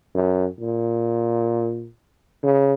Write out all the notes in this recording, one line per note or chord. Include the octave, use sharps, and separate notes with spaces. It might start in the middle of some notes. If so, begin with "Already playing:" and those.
F#2
A#2
C#3